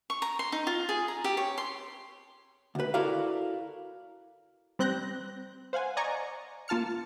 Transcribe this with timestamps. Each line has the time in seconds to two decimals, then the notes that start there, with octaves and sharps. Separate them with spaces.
0.10 C#6
0.22 A#5
0.39 C6
0.52 D#4
0.67 F4
0.89 G#4
1.08 A#5
1.24 G4
1.37 C#5
1.58 C6
2.75 D2 B4
2.94 E4 F#4 A4 A#4 D5 F5
4.79 G3 C4 F#6 G6 A#6
5.73 C5 F5 F#5 G#5
5.97 D5 D#5 G#5 A#5 C#6
6.68 A#3 F4 A5 F6 C#7